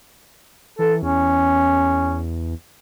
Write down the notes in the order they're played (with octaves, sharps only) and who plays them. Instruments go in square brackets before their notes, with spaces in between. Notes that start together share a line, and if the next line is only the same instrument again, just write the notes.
[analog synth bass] E3 [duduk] A4
[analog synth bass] E2 [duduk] C#4